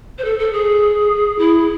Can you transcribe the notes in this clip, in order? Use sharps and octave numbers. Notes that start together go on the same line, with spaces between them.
C5
A4
A4
G#4
E4